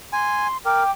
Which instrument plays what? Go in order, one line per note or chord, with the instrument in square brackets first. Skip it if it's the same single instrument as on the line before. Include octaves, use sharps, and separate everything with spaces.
[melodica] G#5 [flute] C6
[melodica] A#4 [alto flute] G5 [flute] D6